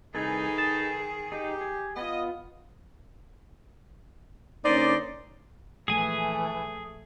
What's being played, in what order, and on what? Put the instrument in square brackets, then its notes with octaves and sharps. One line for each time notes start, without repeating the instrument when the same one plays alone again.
[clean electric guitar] C2 [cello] D#3 G#4 [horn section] D#4 [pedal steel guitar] A4 B4 G#5
[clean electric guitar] A5
[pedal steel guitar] D#4 [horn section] G4
[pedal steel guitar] G#4
[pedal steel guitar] B3 F4 [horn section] D#5
[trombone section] D3 A#3 C#4 [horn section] D#4 C5 D5
[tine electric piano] A#1 [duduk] E3 [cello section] A3 [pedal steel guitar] G#4 G#5